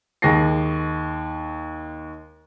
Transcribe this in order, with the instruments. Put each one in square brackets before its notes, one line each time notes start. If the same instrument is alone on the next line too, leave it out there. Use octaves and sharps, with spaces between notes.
[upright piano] D#2 G#3 A#6 C7